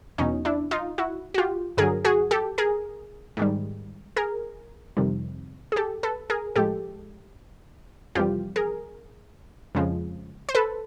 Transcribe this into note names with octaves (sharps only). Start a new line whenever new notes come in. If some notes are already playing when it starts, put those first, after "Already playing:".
E2 B2 F#3 C#4 D#4
D4 E4
D#4 F4
E4 F#4
F#4
F4 G4
G2 D3 F#3 G#4 A#4
F#4 G#4
G4 A4
G#4 A#4
G#2 D#3 G3
G#4 A#4
F2 C3 D#3 G3
G#4
G4 A4
A4 B4
G#4 A#4
A2 F3 G#3 G4 A4
F2 C3 E3 G3 F4 G4
G#4 A#4
F2 C#3 F3 G#3
C5
A4 B4